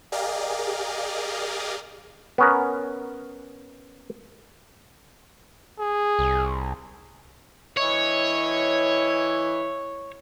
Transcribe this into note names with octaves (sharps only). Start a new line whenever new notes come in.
G4 G#4 A#4 D5 D#5 F5
B3 C#4 A#4
G#4
C2
E3 E4 C#5 D#5